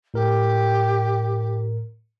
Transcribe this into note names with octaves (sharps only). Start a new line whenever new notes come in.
A2 G4 A#4